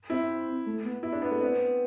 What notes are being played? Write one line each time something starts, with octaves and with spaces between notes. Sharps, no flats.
C4 E4
A3
B3
E4
D4
B3
A3
B3 C4